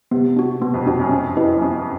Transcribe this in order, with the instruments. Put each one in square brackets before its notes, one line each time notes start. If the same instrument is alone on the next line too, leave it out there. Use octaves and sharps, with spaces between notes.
[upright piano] C3 [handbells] B3
[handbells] D4 F#4
[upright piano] B2 [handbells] B3
[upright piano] F2
[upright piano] F2 [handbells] D4 F#4
[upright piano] F#2
[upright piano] F2 [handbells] C#4
[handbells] E4 G4 B4 D#5
[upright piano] F#2
[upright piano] F2 [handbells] C#4